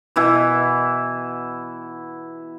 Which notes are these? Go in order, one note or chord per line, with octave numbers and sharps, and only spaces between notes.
B2 E3 E4